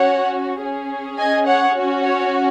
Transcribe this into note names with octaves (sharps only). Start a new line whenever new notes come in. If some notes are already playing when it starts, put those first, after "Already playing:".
Already playing: C#4 F#4 C#5 F#5
C#4 G#4
D#5 G#5
C#5 F#5
C#4 F#4
C#5